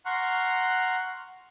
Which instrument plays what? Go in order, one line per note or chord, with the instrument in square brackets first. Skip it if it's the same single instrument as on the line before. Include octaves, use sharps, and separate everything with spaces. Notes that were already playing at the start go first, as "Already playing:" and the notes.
[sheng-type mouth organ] F#5 A#5 C6 C#6 F6 F#6